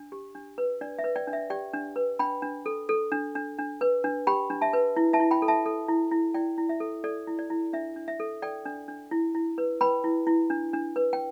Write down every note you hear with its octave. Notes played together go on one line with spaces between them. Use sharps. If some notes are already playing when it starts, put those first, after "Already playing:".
Already playing: D4
G4
D4
B4
D4 D5
E5
B4
D5 G5
D4
E5
G4 D5 G5
D4
B4
D4 G5 B5
D4
A4
A4
D4
D4
D4
B4
D4
G4 G5 B5
D4
E5 A5
B4
E4
E5 A5
E4
G5 B5
A4
E5 A5
A4
E4
E4
E4 D5 G5
E4
E5
A4
A4 D5
E4
D5
E4
D4 E5
D4
E5
A4
A4 D5 G5
D4
D4
E4
E4
B4
B4 G5 B5
E4
E4
D4
D4
B4
G5